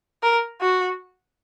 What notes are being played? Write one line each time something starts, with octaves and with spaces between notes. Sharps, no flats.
A#4
F#4